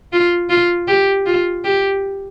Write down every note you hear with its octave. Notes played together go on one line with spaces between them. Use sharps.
F4
F4
G4
F4
G4